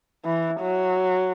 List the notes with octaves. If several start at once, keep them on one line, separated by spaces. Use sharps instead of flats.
E3
F#3